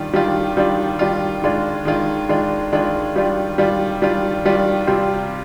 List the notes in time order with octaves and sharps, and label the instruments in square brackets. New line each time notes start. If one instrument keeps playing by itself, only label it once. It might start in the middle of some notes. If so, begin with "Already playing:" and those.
Already playing: [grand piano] D#3 G3 D4 F4
D#3 G3 D4 F4
D#3 G3 D4 F4
D#3 G3 D4 F4
D#3 G#3 D4 F4
D#3 G#3 D4 F4
D#3 G#3 D4 F4
D#3 G#3 D4 F4
D#3 G3 D4 F4
D#3 G3 D4 F4
D#3 G3 D4 F4
D#3 G3 D4 F4
C3 G3 C4 F4